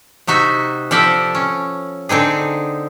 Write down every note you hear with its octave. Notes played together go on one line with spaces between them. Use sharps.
C3 D#4 F#4 E5
F3 C4 A4 D5 E5 F#5
C#4
D3 C4 D#4 G#4